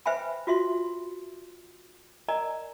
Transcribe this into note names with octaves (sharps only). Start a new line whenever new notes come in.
B4 C5 E5 G5 G#5 B5
F4 F#4 E5 C6
A#4 D5 D#5 G#5 A#5